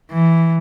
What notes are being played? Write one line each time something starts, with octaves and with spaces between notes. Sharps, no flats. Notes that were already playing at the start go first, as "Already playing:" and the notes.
E3